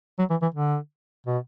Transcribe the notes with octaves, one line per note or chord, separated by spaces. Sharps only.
F#3
E3
E3
D3
B2